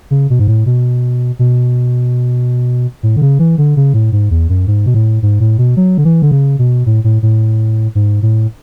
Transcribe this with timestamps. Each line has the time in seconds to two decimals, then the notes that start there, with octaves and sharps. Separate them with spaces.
0.11 C#3
0.30 B2
0.39 G#2
0.47 A2
0.66 B2
1.39 B2
3.03 A2
3.16 D3
3.22 C#3
3.39 E3
3.58 D3
3.76 C#3
3.94 A2
4.12 G#2
4.31 E2
4.49 F#2
4.67 G#2
4.86 B2
4.94 A2
5.22 G#2
5.40 A2
5.58 B2
5.77 F#3
5.98 D3
6.05 E3
6.22 D3
6.31 C#3
6.59 B2
6.86 A2
7.04 A2
7.22 A2
7.95 G#2
8.22 A2